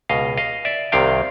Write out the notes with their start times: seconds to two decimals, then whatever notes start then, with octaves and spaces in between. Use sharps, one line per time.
0.09 C#2 B2 D#5 F5
0.37 D#5 F5
0.65 D5 E5
0.92 C2 C3 D#3 F5 G5